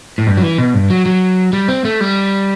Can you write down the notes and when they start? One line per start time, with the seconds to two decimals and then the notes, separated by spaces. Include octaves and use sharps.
0.18 A2
0.27 G2
0.37 F#3
0.43 E3
0.58 B2
0.74 G2
0.90 F#3
1.06 F#3
1.53 G3
1.68 C4
1.85 A3
2.01 G3